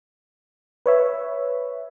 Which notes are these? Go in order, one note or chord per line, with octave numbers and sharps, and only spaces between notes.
B4 C#5 E5